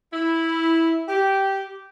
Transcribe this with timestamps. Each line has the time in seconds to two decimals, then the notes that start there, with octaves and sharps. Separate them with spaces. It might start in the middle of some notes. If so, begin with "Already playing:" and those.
0.13 E4
1.08 G4